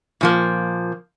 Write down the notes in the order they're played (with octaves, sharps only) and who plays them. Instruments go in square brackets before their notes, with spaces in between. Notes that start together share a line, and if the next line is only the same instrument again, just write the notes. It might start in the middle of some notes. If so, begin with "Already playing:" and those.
[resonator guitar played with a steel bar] A#2 F3 A#3